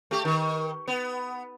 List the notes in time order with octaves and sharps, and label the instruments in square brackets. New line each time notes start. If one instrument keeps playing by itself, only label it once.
[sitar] A3 G4
D#3
B3